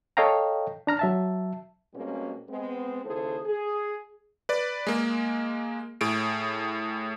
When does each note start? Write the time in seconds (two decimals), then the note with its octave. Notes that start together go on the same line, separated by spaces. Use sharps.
0.17 A4 C#5 D#5 F5 G5 A#5
0.87 D4 A#5 F6
0.99 F#3 E5 A5
1.94 B2 G3 G#3 A#3 C4 C#4
2.48 G#3 B3 C4
3.05 D#2 C#3 E4 G#4 A4 C5
3.46 G#4
4.49 B4 D5
4.87 G#3 A#3
6.01 A2 G#4 D7